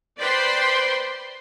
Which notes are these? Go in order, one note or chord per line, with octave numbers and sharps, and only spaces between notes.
B4 C5 D5 G5 B5 C6